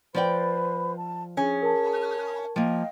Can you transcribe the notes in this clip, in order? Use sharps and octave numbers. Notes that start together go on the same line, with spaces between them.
F3 B4 C5 D5 G5 B5
A5
C#4 G#4
A#4 A5
F3 A#3 D#5 F5 G5